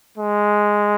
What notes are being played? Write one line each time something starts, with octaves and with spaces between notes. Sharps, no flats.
G#3